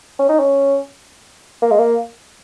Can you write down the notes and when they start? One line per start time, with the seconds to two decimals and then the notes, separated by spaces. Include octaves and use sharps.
0.19 C#4
0.29 D#4
0.39 C#4
1.62 A#3
1.71 G#3
1.79 A#3